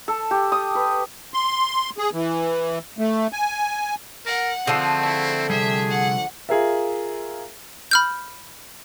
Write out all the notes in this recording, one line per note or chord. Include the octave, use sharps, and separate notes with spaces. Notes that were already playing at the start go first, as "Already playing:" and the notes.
A4
G4
D#6
B4
C6
G#4
E3
A3
G#5
A#4 F#5
D3 F3 A3 C4 G#4 F5
E4
C3 G3 G#4 E5
F#5
F4 G#4 A#4 E5
B5 F6 G6